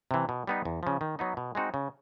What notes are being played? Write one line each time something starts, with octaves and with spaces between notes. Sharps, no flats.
C3 E3
B2
G3 B3 D#4
E2
C#3 F3
D#3
F#3 B3 D#4
B2
G#3 C4 D#4 F#4
C#3